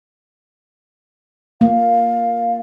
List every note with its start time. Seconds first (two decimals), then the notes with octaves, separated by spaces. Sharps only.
1.61 A#3 F5